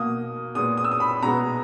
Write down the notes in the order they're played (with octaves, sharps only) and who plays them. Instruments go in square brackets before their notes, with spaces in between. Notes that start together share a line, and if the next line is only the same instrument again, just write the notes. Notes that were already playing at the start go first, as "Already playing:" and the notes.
Already playing: [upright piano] B2 A#3 D#6
A#2 G#3 B3 D#6
D#6
E6
D#6
B5
B2 G#3 B3 A#5